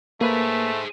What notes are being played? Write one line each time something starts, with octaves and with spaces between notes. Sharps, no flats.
A3 A#3 G#4 B4 C5